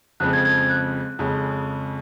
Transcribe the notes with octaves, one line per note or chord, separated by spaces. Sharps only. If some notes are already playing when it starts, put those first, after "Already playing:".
F2 C#3 F3 G#3 C4 F#6
G#6
G#6
G#6
F#6
F2 C#3 G#3 C#4